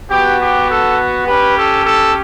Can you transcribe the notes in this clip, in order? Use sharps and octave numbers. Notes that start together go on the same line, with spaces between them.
B3 F#4 G4
G4
A4
C#4 G4 B4
A4
A4